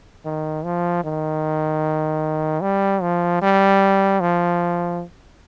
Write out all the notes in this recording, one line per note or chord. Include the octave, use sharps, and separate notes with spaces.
D#3
F3
D#3
G3
F3
G3
F3